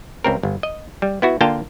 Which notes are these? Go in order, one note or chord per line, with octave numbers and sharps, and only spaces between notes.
C#2 C4 A#4
G1
D#5
G3
B3 E4 F#4
D3 A#3 F4 F5 G5 A5